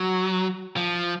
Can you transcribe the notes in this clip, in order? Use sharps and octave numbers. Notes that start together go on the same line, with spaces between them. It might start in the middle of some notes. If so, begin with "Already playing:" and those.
Already playing: F#3
F3